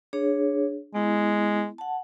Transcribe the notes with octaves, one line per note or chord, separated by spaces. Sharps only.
D4 G#4 C#5
G#3 B3 E4
F#5 A5